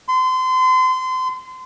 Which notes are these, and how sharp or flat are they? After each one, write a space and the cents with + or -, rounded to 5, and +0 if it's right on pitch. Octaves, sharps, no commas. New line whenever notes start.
C6 -30